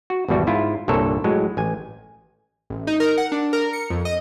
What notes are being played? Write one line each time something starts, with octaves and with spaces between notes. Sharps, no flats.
F#4
G#1 E2 B2 G3 F#4
G#2 E4 F4
C2 G2 A#2 A4 C#5
A2 F#3 G#3
A1 G#5
A1
D#4
A#4
F#5
D4
A#4
C#7
F2
D#5